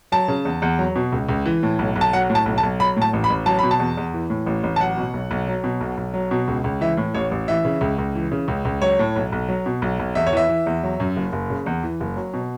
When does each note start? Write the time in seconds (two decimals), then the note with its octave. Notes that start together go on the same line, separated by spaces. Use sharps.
0.12 F#3 A5
0.28 C#3
0.45 E2
0.62 E2
0.79 F#3
0.96 B2
1.12 C#2
1.29 C#2
1.46 E3
1.63 A2
1.79 B1
1.96 B1
2.01 A5
2.13 F#3 F#5
2.30 A2
2.35 A5
2.46 B1
2.58 A5
2.63 B1
2.80 F#3 B5
2.97 A2
3.02 A5
3.13 A1
3.24 B5
3.30 A1
3.46 F#3 A5
3.59 B2 B5
3.71 A5
3.79 E2
3.97 E2
4.14 E3
4.30 A2
4.46 A1
4.63 A1
4.76 A5
4.80 F#3 F#5
4.97 B2
5.14 B1
5.31 B1
5.48 F#3
5.64 B2
5.81 B1
5.97 B1
6.14 F#3
6.31 B2
6.48 C#2
6.64 C#2
6.81 E3 E5
6.97 A2
7.14 A1 C#5
7.31 A1
7.48 E3 E5
7.65 C#3
7.81 C#2
7.98 C#2
8.15 E3
8.32 C#3
8.48 C#2
8.65 C#2
8.82 F#3 C#5
8.99 A2
9.16 B1
9.32 B1
9.49 F#3
9.66 B2
9.82 B1
9.99 B1
10.15 E2 E5
10.27 C#5
10.33 E3 E5
10.49 E3
10.66 E2
10.83 F#3
11.00 F#2
11.16 F#1
11.32 F#1
11.50 C#3
11.66 E2
11.83 E3
12.00 F#1
12.17 F#3
12.34 B2